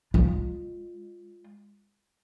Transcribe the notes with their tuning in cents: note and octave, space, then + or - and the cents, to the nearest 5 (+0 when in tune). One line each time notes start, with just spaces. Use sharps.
G#3 -30 F4 +5